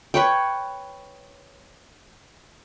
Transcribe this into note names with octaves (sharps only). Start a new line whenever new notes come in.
B4 C#5 G5